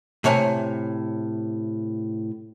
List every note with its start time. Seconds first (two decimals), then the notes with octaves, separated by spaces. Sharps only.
0.24 A2 C3 C#5 G#5 A#5